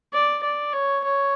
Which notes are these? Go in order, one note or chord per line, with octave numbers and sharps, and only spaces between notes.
D5
D5
C#5
C#5